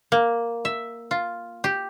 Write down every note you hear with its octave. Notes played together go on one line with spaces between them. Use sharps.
A#3
E5
F4
G4